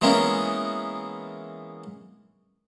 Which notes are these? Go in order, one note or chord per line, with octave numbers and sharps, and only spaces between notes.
E3 G#3 A#3 B3 C#4